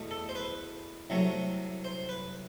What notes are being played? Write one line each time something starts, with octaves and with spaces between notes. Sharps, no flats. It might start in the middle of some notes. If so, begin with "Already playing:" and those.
Already playing: E2 B2 A3
A4
C5
B4
C2 C3 F#3 A3
C5
B4